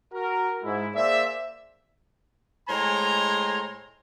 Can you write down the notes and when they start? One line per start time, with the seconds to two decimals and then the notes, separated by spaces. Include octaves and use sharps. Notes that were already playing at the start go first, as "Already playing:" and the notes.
0.13 F#4 A#4
0.64 G#2 E4
0.94 A#3 G#4 C5 D5 E5
2.69 A2 G#3 C5 C#5 G#5 A#5